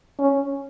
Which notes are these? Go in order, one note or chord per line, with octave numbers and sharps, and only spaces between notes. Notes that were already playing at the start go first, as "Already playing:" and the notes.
C#4